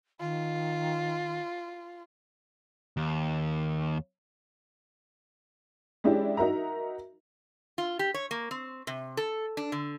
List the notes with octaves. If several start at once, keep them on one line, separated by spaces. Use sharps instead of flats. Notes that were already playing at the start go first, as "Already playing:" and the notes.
D#3 F4
D#2
G#3 C#4 D4 E4 G4
D#4 F#4 A#4 E5 A#5
F4
G4
C#5
A#3
C4
C3
A4
D4
D3